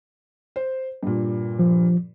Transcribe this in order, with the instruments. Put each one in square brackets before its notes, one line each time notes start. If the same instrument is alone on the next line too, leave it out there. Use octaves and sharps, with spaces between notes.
[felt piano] C5
G2 A#2
[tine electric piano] F3